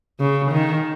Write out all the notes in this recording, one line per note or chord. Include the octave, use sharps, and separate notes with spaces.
C#3
D#3